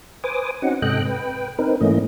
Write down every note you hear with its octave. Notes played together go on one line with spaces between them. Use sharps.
B4 C5 G#5 D6 D#6
C4 C#4 D#4 F#4 F#5
G#2 C3 A4 D#5 G5 F#6
B4 G5
C4 D#4 A#4 B4
G#2 E3 A3 A#3 C#4 D#5